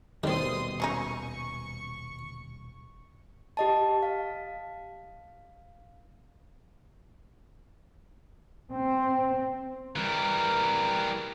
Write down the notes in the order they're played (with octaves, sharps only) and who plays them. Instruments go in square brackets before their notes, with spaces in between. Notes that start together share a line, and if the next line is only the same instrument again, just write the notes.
[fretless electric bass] D#1 B2 G3 [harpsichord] D#3 C4 [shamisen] A3 [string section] C6 D#6
[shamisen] F#3 C#4 D#4 [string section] C#6
[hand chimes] G4 D#5 A5
F5
[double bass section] C4
[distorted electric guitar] E3 G3 [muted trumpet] A#4